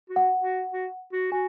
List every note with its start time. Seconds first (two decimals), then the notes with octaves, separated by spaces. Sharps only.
0.10 F#4
0.16 F#5
0.41 F#4
0.72 F#4
1.13 F#4
1.32 F#4 G#5